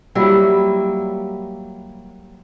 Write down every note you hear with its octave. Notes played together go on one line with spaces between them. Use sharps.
F#3 G3 A#3 E4